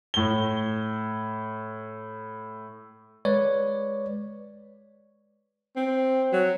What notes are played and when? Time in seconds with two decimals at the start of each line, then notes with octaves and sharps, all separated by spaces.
0.14 A2 G7
3.25 G#3 B4 C#5 D5
5.76 C4
6.32 F#3